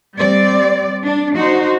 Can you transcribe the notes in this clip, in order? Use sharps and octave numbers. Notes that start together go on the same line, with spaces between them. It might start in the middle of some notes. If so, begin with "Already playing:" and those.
G3 C4 D5
D4
D#4 F#4 C5